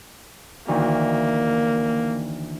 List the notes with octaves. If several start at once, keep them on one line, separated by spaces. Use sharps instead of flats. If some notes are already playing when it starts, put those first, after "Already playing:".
D2 D#3 E3 A#3